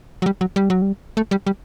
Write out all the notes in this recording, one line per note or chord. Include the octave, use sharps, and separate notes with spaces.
F#3
G3
F#3
G3
F#3
G3
A3
G3
G3